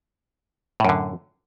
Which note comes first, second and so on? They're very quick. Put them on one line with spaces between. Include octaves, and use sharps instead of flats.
A2 F#2 D3